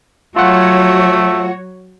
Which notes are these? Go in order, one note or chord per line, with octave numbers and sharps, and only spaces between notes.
F#3 A3 F4 F#4 C#5 F#5